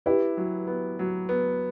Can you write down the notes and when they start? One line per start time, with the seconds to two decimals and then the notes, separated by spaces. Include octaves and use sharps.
0.06 E4 G4 B4
0.37 F#3
0.67 B3
0.99 F#3
1.29 B3